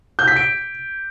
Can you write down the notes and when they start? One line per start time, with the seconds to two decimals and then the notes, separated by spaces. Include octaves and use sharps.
0.19 G6
0.28 B6
0.36 D7